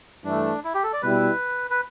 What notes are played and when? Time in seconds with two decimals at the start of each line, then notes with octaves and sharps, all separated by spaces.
0.24 G2 E3 A3 D4
0.64 E4
0.74 G4
0.83 A4
0.93 D5
1.03 B2 G3 E4 B4
1.71 B4